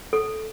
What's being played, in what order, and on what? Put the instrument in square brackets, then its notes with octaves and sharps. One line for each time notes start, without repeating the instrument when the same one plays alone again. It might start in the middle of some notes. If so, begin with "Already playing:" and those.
[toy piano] A4